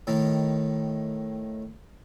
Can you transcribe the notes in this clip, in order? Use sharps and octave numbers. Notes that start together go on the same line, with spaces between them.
A2 D#3